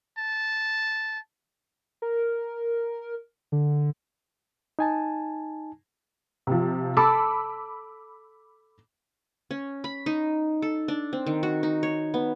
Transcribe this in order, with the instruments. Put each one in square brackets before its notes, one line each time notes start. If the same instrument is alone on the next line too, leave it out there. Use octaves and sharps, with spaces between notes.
[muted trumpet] A5
[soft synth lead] A#4
D3
[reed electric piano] D#4 G#5 A5
[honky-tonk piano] C3 F3
[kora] A4 [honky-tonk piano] B5 D6 E6
[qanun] C#4
B5
D#4
A4
D4
C4
D#3
F#4
D#4
C#5
B3